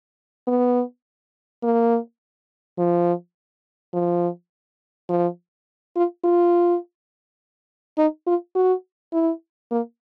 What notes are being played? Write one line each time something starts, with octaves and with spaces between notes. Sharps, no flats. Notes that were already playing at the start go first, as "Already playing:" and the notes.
B3
A#3
F3
F3
F3
F4
F4
D#4
F4
F#4
E4
A#3